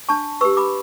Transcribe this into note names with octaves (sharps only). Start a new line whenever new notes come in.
D4 A5 C#6
G4 B4 C#6 E6
B5 D6